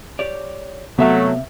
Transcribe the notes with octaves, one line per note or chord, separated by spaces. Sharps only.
G4 C#5 D5
C3 F#3 A3 B3 E5 F5